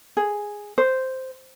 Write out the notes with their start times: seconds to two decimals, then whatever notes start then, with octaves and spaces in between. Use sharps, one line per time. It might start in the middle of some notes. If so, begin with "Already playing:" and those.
0.17 G#4
0.78 C5